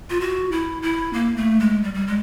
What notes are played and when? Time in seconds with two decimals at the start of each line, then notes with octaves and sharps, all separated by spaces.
0.10 F4
0.20 F#4
0.52 E4
0.82 E4
1.13 A#3
1.37 A3
1.60 G#3
1.84 G3
1.95 G3
2.07 G#3